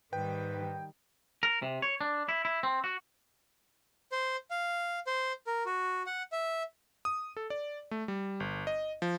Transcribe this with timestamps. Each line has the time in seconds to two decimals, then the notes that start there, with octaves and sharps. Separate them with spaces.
0.13 G#2 D#3 G3 B4 G5
1.43 A#4
1.62 C3
1.82 C#5
2.01 D4
2.29 E4
2.45 E4
2.63 C4
2.84 F#4
4.12 C5
4.51 F5
5.07 C5
5.47 A#4
5.66 F#4
6.06 F#5
6.32 E5
7.05 D#6
7.37 A4
7.50 D5
7.91 A3
8.08 G3
8.40 G1
8.67 D#5
9.02 F3